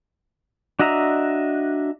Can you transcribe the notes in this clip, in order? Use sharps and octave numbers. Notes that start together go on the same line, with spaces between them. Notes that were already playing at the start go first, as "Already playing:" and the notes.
D4 F#4 D#5 E5 A#5